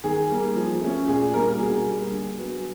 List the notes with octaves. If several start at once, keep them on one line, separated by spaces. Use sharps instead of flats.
D#3 G#4
G3 A#3
F3
A3 C#4
A#2 G#4
G3 A#3 D4 A#4
B2 G#4
G3 A#3
D3
F#3 B3